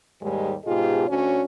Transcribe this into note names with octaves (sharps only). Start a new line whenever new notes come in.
D#2 G#2 G3 G#3 G4
G#2 B2 F4 G4 G#4 D#5
D2 C#4 D4 F#4 C#5